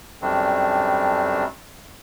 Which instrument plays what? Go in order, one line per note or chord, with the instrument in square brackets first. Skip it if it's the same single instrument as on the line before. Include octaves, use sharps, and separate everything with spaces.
[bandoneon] F#2 D#3 G3 A3 C4 D4